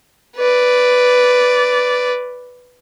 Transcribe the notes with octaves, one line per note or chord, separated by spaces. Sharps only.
B4 D5